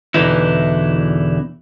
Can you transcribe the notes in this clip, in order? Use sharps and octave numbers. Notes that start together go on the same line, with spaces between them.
E2 B2 D3 E3 D#4 E4